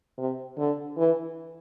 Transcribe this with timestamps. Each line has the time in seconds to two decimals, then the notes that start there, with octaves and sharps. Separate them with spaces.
0.18 C3
0.58 D3
0.98 E3